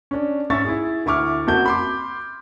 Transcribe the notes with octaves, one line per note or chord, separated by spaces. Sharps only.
C#4 D4
G#2 C#4 E5 C#6 A6
E4 G#4
D2 E4 C#6 D6 F6
F#1 F2 F#4 G6
B5 C6 D6